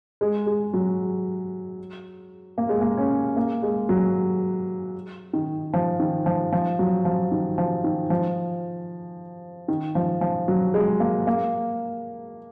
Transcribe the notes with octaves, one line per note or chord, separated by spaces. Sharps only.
G#3
G#3
F#3
A#3
G#3
A#3
C#4
A#3
G#3
F#3
D#3
F3
D#3
F3
F3
F#3
F3
D#3
F3
D#3
F3
D#3
F3
F3
F#3
G#3
A#3
A#3